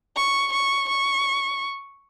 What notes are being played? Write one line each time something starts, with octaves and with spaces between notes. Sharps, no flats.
C#6
C#6
C#6